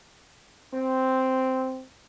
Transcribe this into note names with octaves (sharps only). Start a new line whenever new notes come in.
C4